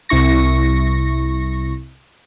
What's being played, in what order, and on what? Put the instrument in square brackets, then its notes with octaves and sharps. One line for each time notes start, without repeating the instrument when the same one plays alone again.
[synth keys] C2 E4 C#6 A#6